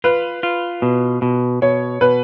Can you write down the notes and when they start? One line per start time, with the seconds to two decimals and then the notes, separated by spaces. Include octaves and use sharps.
0.04 F4 B4
0.43 F4
0.82 B2
1.22 B2
1.62 B2 C#5
2.01 B2 B4